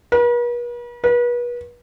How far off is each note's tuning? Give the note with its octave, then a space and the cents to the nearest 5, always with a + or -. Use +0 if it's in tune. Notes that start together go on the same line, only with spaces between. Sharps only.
B4 -45
B4 -35